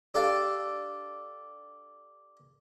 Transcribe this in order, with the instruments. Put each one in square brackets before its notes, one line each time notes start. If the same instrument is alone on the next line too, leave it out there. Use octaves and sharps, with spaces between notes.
[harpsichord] D4 G4 A4 F5 A5